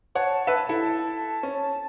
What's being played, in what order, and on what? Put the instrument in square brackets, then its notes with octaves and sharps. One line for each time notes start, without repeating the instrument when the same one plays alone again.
[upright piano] C#5 F#5 [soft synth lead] A5
[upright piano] B4 E5
E4 A4
[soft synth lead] A5
[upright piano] C#4